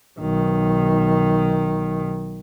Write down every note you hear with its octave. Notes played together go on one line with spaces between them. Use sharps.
B1 D#3